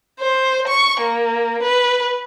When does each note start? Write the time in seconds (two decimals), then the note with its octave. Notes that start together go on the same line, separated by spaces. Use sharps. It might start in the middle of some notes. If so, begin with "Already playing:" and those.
0.20 C5
0.68 C#6
1.00 A#3
1.63 B4